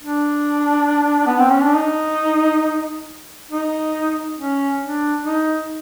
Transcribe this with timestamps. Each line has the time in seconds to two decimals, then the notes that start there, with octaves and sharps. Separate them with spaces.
0.01 D4
1.27 B3
1.39 C4
1.51 C#4
1.63 D4
1.76 D#4
3.51 D#4
4.39 C#4
4.82 D4
5.25 D#4